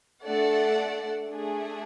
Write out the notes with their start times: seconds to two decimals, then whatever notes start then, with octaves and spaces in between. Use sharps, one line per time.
0.25 A3 D4 A4 D5 F#5
1.30 A3 D4 G#4